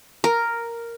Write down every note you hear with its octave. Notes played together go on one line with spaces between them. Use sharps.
A#4